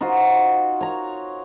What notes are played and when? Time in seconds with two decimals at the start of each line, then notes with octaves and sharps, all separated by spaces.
0.01 D#4 F4 F#4 C5
0.81 C#5 A#5